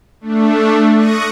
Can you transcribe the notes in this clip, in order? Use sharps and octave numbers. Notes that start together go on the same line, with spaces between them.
A3 D4
C#6 D#6 F#6 A#6 C#7 D#7